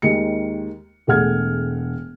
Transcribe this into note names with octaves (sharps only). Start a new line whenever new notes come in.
D#2 D#3 G#3 C#7
E1 A3 G#4 F#5 F6 G#6